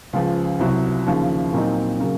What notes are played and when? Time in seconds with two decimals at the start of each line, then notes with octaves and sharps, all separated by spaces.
0.13 C#2 C#3 F3
0.59 C2 C3 F#3
1.06 D#2 C#3 F3
1.53 A#2 F#3 C4 D#4
2.00 C#3 F#3 A#3